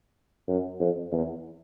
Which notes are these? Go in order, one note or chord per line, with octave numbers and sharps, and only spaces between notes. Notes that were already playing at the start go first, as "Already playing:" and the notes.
F#2
F2
E2